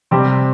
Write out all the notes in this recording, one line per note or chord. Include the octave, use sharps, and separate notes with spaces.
C3 G3 C4 G4